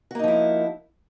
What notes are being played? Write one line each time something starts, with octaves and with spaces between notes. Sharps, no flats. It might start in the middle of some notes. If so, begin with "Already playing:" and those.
F3 A#3 D#4 E4 F#4